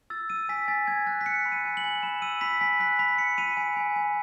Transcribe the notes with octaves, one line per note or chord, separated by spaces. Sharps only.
E6 A6
E6 D#7
G#5 B6
G#5 A6
G#5 G#6
F#6 A6
B6
F#6 C#7
B5
D#7
G#5
F#7
G#5
B5 E7
E6 D#7
B5 B6
G#5 B6
F#6 B6
B5 B6
B5 C#7
B5 D#7
G#5
G#5
G#5